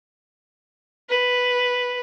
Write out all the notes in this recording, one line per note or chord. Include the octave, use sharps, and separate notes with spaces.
B4